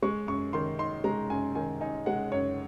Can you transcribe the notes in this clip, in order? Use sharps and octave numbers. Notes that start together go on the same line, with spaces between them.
G#3 C#6
F#2 C#6
D#3 C6
D#4 C6
G#3 A#5
F#2 G#5
D#3 G#5
D#4 G#5
G#3 F#5
F#2 C#5